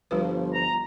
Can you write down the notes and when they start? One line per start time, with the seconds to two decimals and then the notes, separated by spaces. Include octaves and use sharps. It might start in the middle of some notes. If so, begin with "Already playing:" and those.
0.11 G1 F3 G3 F4 B4
0.53 A#5